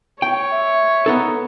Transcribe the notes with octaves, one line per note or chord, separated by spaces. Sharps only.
C#5 G5
E5
B3 D#4 A4